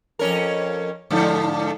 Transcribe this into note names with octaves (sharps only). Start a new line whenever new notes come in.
F2 C#4 A#4
G#2 D3 F3